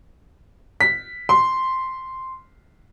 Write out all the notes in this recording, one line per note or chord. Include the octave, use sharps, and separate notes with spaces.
B6
C6